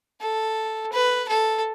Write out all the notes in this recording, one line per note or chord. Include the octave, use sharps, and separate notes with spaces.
A4
B4
A4